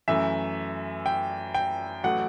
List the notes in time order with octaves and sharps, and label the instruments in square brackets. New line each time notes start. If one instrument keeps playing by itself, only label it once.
[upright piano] F#2 E3 A3 E5
G5
G5
A1 F#3 A3 F#5